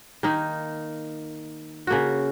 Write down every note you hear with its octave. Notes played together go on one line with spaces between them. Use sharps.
D#3 A#3 D#4
C#3 A#3 F#4